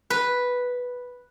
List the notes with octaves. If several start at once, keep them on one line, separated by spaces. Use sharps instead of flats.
B4